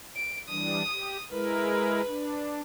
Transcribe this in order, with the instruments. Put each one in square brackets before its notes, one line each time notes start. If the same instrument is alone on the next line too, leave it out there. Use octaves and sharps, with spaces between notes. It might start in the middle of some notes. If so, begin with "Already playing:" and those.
[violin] D7
[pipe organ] E3 G3 D4 [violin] D#6
[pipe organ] G4
[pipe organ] G#3 E4 A#4 [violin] B4
[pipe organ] D4